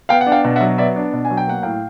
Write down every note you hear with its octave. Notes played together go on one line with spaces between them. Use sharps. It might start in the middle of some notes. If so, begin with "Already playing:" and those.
B3 F5 G5
F#5
D4
F5 G5
B2
E5 F#5
F#3
B3 D5 E5
D4
B2
G#5
F#3
G5
A#3 F#5
A2 F5 G5